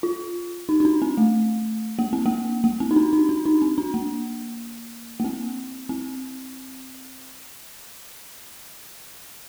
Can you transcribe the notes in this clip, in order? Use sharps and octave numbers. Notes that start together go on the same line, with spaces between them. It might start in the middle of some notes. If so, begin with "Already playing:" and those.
F4
D#4
D#4
D4
C4
A3
A#3
C4
A#3
A#3
C4
D#4
D4
D#4
D4
D#4
C4
D4
A#3
A#3
C4
C4